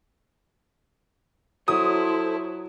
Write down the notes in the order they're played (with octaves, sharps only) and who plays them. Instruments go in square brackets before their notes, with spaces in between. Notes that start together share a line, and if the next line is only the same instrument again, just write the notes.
[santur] F#3 [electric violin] E4 [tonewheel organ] A4 C5 [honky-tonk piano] D#6